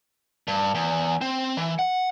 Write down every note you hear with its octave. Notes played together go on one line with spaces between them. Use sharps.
G2
E2
C4
E3
F#5